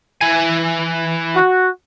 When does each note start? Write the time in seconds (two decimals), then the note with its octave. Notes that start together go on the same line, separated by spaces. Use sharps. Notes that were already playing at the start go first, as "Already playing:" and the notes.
0.21 E3 G#5
1.35 F#4